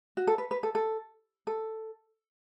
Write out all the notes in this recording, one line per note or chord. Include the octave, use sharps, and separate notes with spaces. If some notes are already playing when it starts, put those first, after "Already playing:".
F#4
A4
B4
B4
A4
A4
A4